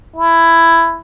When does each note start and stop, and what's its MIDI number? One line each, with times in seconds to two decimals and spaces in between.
0.16 1.00 64